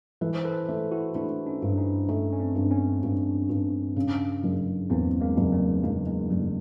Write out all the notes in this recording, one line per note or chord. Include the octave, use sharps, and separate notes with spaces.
E3 A4 B4
C5
A4 B4
A3
E4 F#4
A3 D4 E4
C#4 D#4
G2
C#4 D#4
A3 C#4 D#4
C#4
C4 D4
G2
B3 C#4
G2
G2
C#3
F#1
E2 A#3 C4
G#3 A#3
F#1
G3 A3
F#1 G#3 A#3
G#3 A#3
F#1 G3 A3